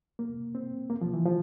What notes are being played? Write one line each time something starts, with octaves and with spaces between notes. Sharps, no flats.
A#3
C4
A#3
F3
E3
F3